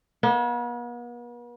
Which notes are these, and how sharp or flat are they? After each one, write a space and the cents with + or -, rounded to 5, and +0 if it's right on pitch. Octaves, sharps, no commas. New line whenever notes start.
B3 -45 E5 -15